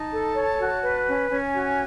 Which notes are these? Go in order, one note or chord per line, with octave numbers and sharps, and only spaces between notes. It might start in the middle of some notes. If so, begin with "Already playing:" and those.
Already playing: D#4 A5
A4
C#5
F#4
B4
C#4
C#4 G#5
F#4